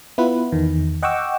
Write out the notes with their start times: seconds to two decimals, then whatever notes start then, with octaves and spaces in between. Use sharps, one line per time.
0.18 B3 E4 F4 B4
0.52 E2 D#3
1.03 D#5 F#5 G5 C#6 D6 E6